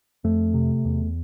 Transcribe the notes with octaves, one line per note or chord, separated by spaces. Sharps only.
F2 A3
C3
E2